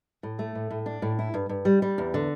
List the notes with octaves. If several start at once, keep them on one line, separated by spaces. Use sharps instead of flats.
A2
A3
A2
A2
D4
A2
E4
G2
G2
G3
G3
E2
D3